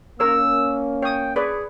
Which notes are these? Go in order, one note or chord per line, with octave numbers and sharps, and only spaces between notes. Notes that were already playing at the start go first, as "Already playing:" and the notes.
A#3 C#4 A#4 C#5 E6
C#5 G5 D#6
G#4 B4 C#5 D5